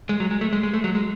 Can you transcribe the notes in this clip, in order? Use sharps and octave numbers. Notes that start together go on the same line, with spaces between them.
G#3
F#3
G#3
A3
G#3
G#3
A3
F#3
G#3